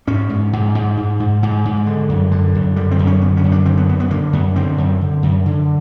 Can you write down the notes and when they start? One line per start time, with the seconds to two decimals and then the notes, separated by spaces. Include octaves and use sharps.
0.07 G#2 C#4
0.29 G#2
0.53 G#2
0.75 G#2
0.97 G#2
1.20 G#2
1.43 G#2
1.65 G#2
1.86 D3
2.09 F#2
2.31 D3
2.55 F#2
2.76 D3 G3
2.91 C4
2.99 F#2
3.07 C#4
3.21 D3 B3
3.37 C#4
3.44 F#2
3.52 D4
3.66 D3 C4
3.77 B3
3.89 F#2 B3
4.00 B3
4.10 D3 A#3
4.33 F#2 B3
4.56 D3 C4
4.78 F#2
5.01 D3
5.23 F#2
5.46 D3